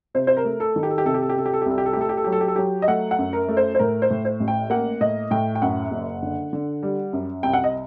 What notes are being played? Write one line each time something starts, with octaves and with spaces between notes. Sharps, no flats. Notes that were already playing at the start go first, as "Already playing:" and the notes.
C3 C5
C5
A#4
A3
A4
D#3
G4
A4
G4
C3 A4
G4
A4
G4
C3 A4
G4
A4
G4
C2 A4
G4
A4
G4
A3 A4
G4
A4
F#3 G4
A4
G4
A4
F#3 G4
D#5
A3 F#5
F#5
F#2
A#4
A3
C5
C5
A2 A#4
C5
A2
C5
A1
G5
A#3 F#5
A2 D#5
A2 G5
G5
F#2 F#5
F#1
D3
D3
G3
F#2
C2 G5
F#5
D#5